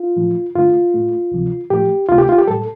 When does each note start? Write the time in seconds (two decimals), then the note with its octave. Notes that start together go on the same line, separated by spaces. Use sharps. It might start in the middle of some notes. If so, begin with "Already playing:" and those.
Already playing: F4
0.16 A2 F3 A3
0.55 G2 D3 A3 F4
0.94 A2 A3
1.32 D2 C3 F3
1.70 A2 F3 A3 G4
2.09 D2 C3 A3 F4
2.18 G4
2.29 F4
2.38 G4
2.48 A2 G3 A4